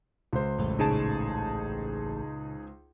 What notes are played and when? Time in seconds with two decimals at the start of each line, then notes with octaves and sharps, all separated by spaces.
0.33 C#2 C5
0.59 A1 F2 A2 E3 F#3
0.79 A#2 C#3 D#4 G#4 A5